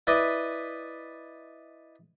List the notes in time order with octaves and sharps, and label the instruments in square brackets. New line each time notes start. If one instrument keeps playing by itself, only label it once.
[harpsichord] E4 B4 D5 D#5